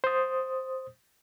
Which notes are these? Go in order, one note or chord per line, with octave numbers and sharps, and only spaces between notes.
C5 D#6